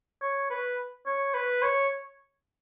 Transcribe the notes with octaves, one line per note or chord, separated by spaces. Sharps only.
C#5
B4
C#5
B4
C#5